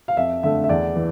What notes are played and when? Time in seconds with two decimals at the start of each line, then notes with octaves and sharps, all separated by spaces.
0.08 F5
0.17 F2 E5
0.43 D3 A3 E5
0.64 E5
0.69 E2 D5
0.96 E3